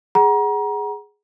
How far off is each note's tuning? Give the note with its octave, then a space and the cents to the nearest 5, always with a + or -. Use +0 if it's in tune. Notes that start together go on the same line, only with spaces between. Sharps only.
G#4 +0 F#5 +20 A#5 +30